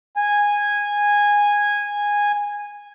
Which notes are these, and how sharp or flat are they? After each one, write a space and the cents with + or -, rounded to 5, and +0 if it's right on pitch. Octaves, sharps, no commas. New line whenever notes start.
G#5 -10